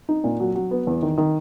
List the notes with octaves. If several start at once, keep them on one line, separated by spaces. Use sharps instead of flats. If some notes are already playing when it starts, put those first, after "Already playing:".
D#4
A#2
F#3
F#3
B3
E2
D#3
D#3